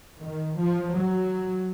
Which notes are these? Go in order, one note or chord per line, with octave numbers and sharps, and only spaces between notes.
D#3
F3
F#3